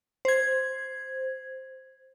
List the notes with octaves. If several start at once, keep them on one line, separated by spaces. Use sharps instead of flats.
C5 G#6